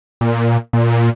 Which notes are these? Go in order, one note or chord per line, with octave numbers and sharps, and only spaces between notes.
A#2
A#2